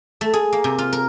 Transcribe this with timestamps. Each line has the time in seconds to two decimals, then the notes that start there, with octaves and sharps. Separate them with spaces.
0.21 A3
0.34 G#4
0.53 A#3
0.64 C3
0.78 F4
0.93 A#4